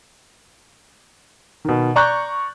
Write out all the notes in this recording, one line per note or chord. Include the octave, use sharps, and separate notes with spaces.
B2 D#3
D5 A#5 C#6 F#6 G6